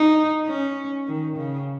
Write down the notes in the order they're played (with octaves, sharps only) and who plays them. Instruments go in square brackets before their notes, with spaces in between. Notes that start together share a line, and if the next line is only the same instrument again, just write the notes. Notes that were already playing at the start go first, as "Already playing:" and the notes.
Already playing: [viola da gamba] D#4
C#4
D#3
C#3